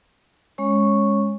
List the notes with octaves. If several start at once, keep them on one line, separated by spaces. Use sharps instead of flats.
G#3 C#4 C#5 C#6